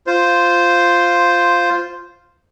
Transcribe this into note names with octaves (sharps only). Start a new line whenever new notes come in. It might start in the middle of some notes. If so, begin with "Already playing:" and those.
F4 C5